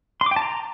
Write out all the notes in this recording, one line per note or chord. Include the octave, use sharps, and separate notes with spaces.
C6
D6
G5
A5
A#5